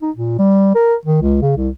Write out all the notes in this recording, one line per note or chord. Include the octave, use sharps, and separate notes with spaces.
D#4
A#2
G3
A#4
D#3
C#2
C#3
C2